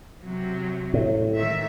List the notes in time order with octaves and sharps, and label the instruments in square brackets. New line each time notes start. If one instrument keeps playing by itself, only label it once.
[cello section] C3 F#3
[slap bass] A2
[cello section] G#2 D#3 E5